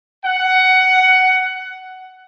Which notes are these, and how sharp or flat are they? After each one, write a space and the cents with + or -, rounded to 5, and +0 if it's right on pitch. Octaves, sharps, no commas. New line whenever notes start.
F#5 +15